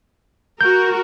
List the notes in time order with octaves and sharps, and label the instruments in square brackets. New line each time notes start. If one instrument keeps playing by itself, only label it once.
[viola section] F#4 A#4 [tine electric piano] G6